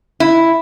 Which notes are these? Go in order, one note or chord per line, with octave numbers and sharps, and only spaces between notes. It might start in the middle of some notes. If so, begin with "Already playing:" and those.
E4